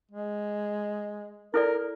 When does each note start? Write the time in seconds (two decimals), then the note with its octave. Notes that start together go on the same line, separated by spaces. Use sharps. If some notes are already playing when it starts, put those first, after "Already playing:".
0.12 G#3
1.54 E4 A4 A#4 D5